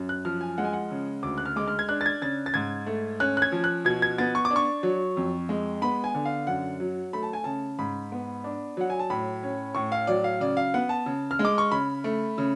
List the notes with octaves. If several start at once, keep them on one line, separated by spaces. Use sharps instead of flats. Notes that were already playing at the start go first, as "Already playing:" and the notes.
Already playing: F#2
F#6
F3 F6
G#5
G#3 F#5
G#5
F#5
C#3
D2 D6
F#6
F6
G#3 D6
F6
G#6
D4 F#6
A6
G#6
C#3 A6
A6
G#2 G#6
A3
C#4 F#6
F#6
G#6
F3
F#6
B2 G#6
G#6
B3 A6
C#6
D6
D4
C#6
F#3
F2
G#3
B3 B5
G#5
D3
F5
F#2 F#5
F#3
A3 B5
A5
G#5
C#3 A5
G#2 B5
B3
D4
F#3 F#5
G#5
A5
A2 B5
C#4
A2 C#6
F5
F#3 D5
F5
C#3 D5
F5
B3 F#5
A5
C#3
F6
G#3
D6
C#6
C#3 B5
A3
C#3